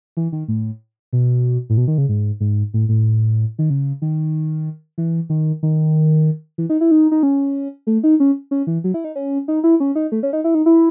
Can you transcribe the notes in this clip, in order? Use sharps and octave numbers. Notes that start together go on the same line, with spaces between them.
E3
D#3
A2
B2
A2
B2
D#3
C#3
G#2
G#2
A2
A2
D#3
C#3
D#3
E3
D#3
D#3
E3
D#4
E4
D#4
D#4
C#4
A3
D#4
C#4
C#4
E3
F#3
E4
D#4
C#4
D#4
E4
C#4
D#4
A3
C#4
D#4
E4
D#4
E4